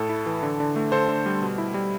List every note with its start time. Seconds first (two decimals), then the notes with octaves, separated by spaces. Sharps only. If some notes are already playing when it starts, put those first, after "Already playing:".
Already playing: A2 A4
0.09 E4
0.26 E3
0.43 D3
0.60 D3
0.76 A3
0.92 D3 A4 C5
1.08 D3
1.26 G3
1.42 B2
1.58 E4
1.74 G3